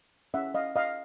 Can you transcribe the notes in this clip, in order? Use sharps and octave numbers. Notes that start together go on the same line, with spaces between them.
C#4 E4 G#4 E5 F#5
D#5 F5
D#5 F5